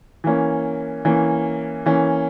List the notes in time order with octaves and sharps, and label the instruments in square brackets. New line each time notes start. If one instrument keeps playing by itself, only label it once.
[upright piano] E3 A#3 C#4
E3 A#3 C#4
E3 A#3 C#4